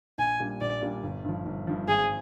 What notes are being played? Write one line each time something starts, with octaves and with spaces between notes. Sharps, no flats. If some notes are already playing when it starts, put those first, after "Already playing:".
A#1 G#5
A#2 G3 D4
A#1 D5
A#2 G3 D4
G1
G2 F3
G1
G2 F3
G#1 G#4